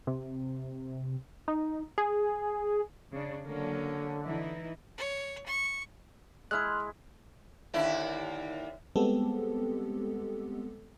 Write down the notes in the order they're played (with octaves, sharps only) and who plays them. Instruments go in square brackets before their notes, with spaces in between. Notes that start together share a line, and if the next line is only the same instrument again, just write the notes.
[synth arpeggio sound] C3
D#4
G#4
[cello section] C#3 D4
[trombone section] D3 [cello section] F#3 A#3 C#4
[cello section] E3 D#4 E4
[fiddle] C#5
C#6
[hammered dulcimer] G#3 E4 [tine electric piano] C6 F6 F#6
[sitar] D#2 D3 E4
[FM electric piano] G3 G#3 B3 C4 G4 A4